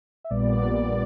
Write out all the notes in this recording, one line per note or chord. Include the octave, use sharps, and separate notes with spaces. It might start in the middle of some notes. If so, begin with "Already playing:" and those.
E5
A#1 A#2 G3 B3 D5
D5